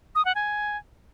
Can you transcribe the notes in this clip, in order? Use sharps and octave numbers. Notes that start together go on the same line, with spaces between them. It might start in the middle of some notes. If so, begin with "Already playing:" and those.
D#6
F#5
G#5